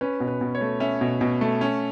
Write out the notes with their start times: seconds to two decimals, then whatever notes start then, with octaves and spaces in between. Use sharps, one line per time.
0.01 C#4 B4
0.20 B2
0.28 B4
0.41 B2
0.55 C#5
0.61 A3
0.80 C#4 E5
1.01 B2
1.21 B2
1.41 A3
1.61 C#4